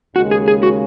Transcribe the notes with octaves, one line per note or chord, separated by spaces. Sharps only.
D#2 C#3 G#3 F#4
G#4
G#4
F#4